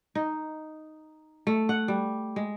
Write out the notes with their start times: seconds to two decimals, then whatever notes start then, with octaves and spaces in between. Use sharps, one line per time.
0.15 D#4
1.47 A3
1.69 F#5
1.88 G3
2.36 G#3